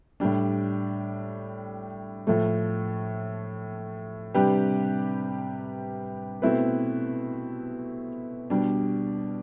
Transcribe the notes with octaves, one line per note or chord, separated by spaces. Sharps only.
A2 G3 D4
A2 F3 A3
C3 G3 D4 G4 B4
B2 A3 C4 E4 B4
B2 G3 D4